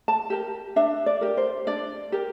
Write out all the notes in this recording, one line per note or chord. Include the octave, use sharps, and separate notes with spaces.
A5
G4 A#4
D4 E5
D5
G4 A#4
C5
D4 D5
G4 A#4